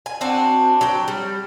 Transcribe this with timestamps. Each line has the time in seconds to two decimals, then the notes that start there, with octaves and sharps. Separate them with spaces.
0.06 G#5
0.21 C4 D4 F#4
0.81 F#3 G5
1.08 G3